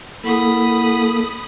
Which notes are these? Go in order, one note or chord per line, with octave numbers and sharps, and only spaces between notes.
A#3 E4 A4 F#5 B5 D#6